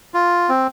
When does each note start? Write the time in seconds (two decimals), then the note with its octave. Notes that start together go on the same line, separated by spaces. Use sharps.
0.14 F4
0.49 C4